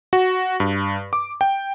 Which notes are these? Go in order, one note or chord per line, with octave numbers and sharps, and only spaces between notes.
F#4
G2
D6
G5